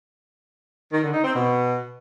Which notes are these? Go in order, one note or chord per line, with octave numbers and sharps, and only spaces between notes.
D#3
D3
D#4
C4
B2